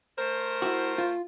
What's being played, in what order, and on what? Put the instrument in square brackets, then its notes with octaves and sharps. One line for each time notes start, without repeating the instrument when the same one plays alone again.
[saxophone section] A3 A#4 C5
[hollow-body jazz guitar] E4 F#4
F4